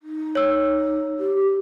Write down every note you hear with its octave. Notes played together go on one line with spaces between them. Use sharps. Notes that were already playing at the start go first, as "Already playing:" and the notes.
D#4
C#5 E6
G4